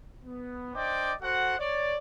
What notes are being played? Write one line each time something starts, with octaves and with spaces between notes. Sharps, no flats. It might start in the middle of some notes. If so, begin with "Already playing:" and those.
B3
D4 C5 D5 D#5 G5 D6
F#4 A4 C5 F#5
C#5 D5